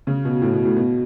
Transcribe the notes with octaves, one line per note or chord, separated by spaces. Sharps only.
C#3
B2
A2
B2
A2
B2